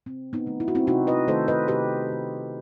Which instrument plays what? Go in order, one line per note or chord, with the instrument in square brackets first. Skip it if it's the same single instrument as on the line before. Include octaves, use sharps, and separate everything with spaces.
[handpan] C3 C4
B3 D#4
D#3 A3
E4
F#4
C4 E4
C3 D#4 F#4
B4 D#5
D#3 A3 A4 C5
B4 D#5
C3 G4 B4
D#3 A3